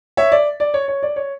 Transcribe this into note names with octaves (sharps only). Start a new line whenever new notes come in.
C#5 E5
D5
D5
C#5
C#5
D5
C#5